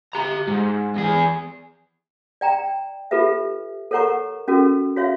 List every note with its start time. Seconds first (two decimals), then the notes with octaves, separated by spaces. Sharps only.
0.13 G4 A#5
0.48 G#2
0.96 E2 G#4
2.41 D5 G5 A#5
3.11 F4 G4 A4 B4 E5
3.91 A4 A#4 C#5 F#5 A#5 C#6
4.48 C#4 F#4 A4 A#4
4.97 F#4 C#5 E5 F5